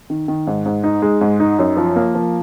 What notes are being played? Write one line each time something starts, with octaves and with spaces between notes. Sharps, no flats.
D#3
D#3
G#2
G#2
D#4
G#3
G#2
D#4
F#2
F3
A#3
F3